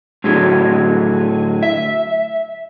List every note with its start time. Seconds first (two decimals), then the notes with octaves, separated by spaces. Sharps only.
0.24 A2 D3 F#3 G#4
1.63 E5